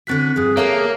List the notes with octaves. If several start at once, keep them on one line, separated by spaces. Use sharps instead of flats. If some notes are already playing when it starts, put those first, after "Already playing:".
D3 C4 C#4 F#4 F#6 B6
G2 F3 G#4
A#3 G4 A4 C#5 E5 F5